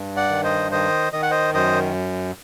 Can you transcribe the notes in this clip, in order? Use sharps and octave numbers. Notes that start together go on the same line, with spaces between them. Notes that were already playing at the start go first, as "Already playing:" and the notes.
Already playing: G2
D5 F#5
D#3
C5 D#5
D#3 C5 D#5
D#3 D#5
F#5
C5 D#5
F#2 C5 D#5